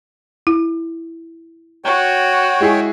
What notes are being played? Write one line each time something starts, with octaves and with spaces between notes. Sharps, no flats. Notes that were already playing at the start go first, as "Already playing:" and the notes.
E4
F#4 C#5 G5
G#3 E4 G#4